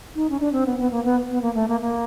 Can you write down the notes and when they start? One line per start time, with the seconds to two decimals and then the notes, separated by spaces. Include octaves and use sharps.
0.15 D#4
0.30 C#4
0.40 D4
0.53 C4
0.66 B3
0.79 B3
0.91 A#3
1.04 B3
1.30 B3
1.42 A#3
1.55 A3
1.68 A#3
1.81 A#3